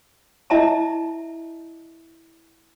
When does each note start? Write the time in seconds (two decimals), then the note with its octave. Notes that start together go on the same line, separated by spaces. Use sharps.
0.50 E4 D#5 E5 A5 A#5